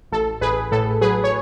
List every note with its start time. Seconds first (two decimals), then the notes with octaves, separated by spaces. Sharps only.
0.12 A1 A4
0.41 A1 G#4 B4
0.72 A2 A4
1.01 F#3 G#4 B4
1.24 C#5